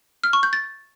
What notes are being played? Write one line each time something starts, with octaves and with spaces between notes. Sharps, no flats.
F6
C#6
G6
A6